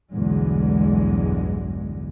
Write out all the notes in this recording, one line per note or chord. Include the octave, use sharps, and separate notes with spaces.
B1 E2 G2 D3 G#3